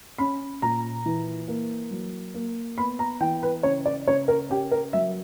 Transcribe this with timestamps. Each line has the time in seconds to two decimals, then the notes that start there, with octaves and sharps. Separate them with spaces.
0.18 C#4 B5
0.62 A#2 A#5
1.06 E3
1.48 A#3
1.91 F#3
2.34 A#3
2.78 B3 B5
2.99 A#5
3.21 E3 G5
3.43 B4
3.63 C#3 C#5
3.86 D5
4.07 C#3 C#5
4.28 A#4
4.50 C#4 G4
4.71 A#4
4.93 F#3 E5